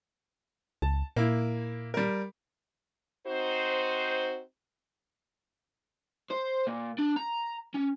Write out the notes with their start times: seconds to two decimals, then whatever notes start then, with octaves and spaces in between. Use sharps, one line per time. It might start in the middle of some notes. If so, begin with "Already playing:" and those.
0.82 C#2 A5
1.16 A#2 A#3 E4
1.94 G3 A#4
3.27 C4 D#4 F#4 C5
6.30 C5
6.67 A#2
6.98 D4
7.16 A#5
7.75 C#4